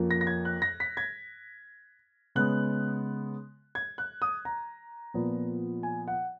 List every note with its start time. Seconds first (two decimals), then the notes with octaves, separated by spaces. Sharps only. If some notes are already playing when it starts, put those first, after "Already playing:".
Already playing: F2 F3 A#3 C#4
0.11 A#6
0.21 A#6
0.27 G#6
0.45 F#6
0.62 A#6
0.80 B6
0.97 G#6
2.35 C#3 G#3 B3 F#6
3.75 G#6
3.98 F#6
4.22 D#6
4.45 A#5
5.14 A#2 F3 B3
5.83 G#5
6.08 F#5